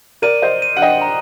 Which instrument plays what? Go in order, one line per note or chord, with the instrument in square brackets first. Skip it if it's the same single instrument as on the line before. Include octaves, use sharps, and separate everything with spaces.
[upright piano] A#4 D5 [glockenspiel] D#7
[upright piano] C5 D#5
[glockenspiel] D#7
[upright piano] F#5
D#5 G5
[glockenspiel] A#5